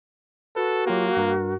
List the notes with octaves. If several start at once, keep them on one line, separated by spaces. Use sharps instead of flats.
F#4 A4 B4
F#3 A#3 F4 G4
G2 A#4